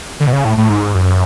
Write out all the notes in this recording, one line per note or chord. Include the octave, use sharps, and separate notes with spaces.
D3
B2
C#3
A2
A2
G#2
F#2